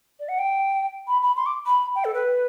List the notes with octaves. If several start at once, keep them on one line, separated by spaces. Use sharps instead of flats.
D5
F#5
G5
B5
B5
C6
D6
B5
G5
A4
B4